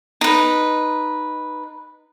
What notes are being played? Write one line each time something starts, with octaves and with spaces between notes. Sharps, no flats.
D#4 B4